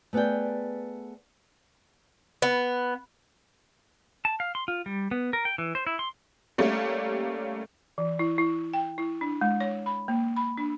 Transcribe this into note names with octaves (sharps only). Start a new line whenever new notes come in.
A3 B3 G#4 D5 G5
B3
A5
F5
C6
F4
G3
B3
A#4
G5
E3
C5
E4
C6
G3 A3 A#3 C#4
E3
E4
E4
G5
E4
D4
G#3
C#5
B5
A#3
B5
D4